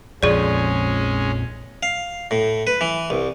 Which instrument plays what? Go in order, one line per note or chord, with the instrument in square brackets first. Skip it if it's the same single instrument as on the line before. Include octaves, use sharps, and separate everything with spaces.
[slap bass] A#1 F2 F3 [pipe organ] G#3 C#4 [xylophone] G#4 D5
[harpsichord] F5
A2
B4
E3
C2